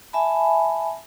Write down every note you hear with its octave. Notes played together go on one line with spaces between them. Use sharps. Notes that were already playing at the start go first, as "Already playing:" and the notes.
E5 G#5 A5 B5